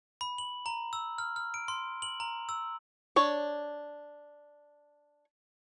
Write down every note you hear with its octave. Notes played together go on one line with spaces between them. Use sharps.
B5
F#7
A#5
E6
F6
F6
D7
C6
F#7
A#5
E6
D4 C#5